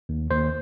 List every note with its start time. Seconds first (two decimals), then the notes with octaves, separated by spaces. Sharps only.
0.09 D#2
0.31 D#2 C5